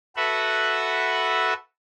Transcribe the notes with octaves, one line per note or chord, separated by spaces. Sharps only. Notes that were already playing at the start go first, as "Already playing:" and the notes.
F#4 A4 B4 E5 F#5